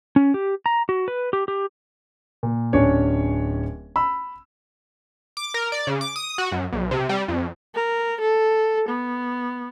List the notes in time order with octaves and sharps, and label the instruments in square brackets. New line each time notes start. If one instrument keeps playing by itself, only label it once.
[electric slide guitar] C#4
G4
A#5
F#4
B4
G4
G4
[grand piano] A#2
D1 C#4 D4 C#5
B5 E6
[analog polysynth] D6
A#4
D5
C#3
D6
D#6
F#4
F#2
B1
C3
G3
F2
[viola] A#4
A4
B3